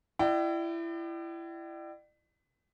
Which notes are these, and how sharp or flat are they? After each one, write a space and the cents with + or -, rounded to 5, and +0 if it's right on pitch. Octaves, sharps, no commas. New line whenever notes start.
E4 +25 D5 +40 G5 -35